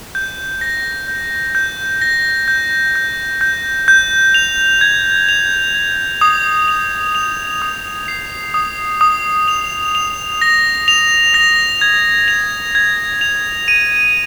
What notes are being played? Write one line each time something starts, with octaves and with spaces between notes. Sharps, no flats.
G6
A#6
G6
G6
A#6
G6
G6
G6
G6
F7
G#6
F7
G#6
D#6
F7
F7
D#6
C7
D#6
D#6
F7
F7
A#6
F7
A#6
G#6
F7
G#6
F7
D#7